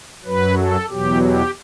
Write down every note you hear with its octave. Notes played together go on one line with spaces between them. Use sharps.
F#2 F#3 B4
A4
E2 B2 F#3 G4
G4